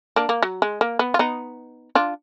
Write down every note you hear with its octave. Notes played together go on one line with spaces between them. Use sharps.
A#3 D4
A#3
F#3
G#3
A#3
B3
F4
B3 D#4
D4 F4